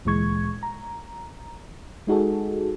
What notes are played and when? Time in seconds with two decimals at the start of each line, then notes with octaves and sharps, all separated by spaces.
0.05 D2 A#2 E3 G#3 C#6 G#6
0.63 A#5
2.07 G#3 D#4 F#4 G#4 A4